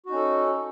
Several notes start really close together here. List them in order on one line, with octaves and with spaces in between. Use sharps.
F#4 D#4 C#4 A4